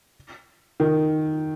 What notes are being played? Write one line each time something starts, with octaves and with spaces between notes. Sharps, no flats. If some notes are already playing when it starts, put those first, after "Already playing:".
D#3